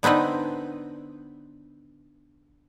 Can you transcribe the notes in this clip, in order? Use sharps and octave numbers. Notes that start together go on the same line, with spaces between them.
D3 B3 C4 D#4 B4